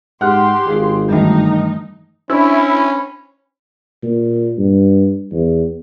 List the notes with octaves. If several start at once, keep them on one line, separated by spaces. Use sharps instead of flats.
G#2 G4 F#5 C6 F6 F#6
G#1 F4 G#4 F5
G2 D#3 E3 A3 D#4
C#4 D4 E4 C5 B5
A#2
G2
E2